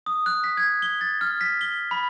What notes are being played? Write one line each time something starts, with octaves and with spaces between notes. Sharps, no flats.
D#6
F#6
B6
G#6
G7
A6
F6
B6
G7
B5